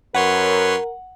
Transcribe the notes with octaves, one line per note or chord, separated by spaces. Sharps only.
F#2 A#4 B4 C#5 F#5 C6